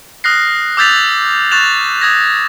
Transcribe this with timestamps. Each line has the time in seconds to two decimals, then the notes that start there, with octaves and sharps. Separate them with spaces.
0.24 D#6 F6 F#6 A#6 C7
0.77 D6 E6 G6 A6 B6 F7
1.51 C#6 F#6 A6 E7 F7
2.01 D#6 G#6 A#6